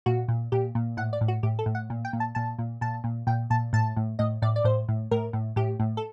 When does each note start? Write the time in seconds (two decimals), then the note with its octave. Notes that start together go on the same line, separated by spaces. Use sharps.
0.06 A#2 F#4
0.28 A#2
0.52 A#2 G4
0.75 A#2
0.97 A2 F#5
1.13 D5
1.21 A2
1.28 F#4
1.43 A2 G4
1.59 A4
1.66 A2
1.75 F#5
1.90 A#2
2.05 G5
2.13 A#2
2.20 A5
2.35 A#2 A5
2.59 A#2
2.81 A#2 A5
3.04 A#2
3.27 A#2 G5
3.50 A#2 A5
3.73 A2 A5
3.97 A2
4.19 A2 D#5
4.42 A2 D5
4.56 D5
4.64 A2 C5
4.88 A2
5.11 A2 A#4
5.33 A2
5.56 A2 G4
5.80 A2
5.97 A4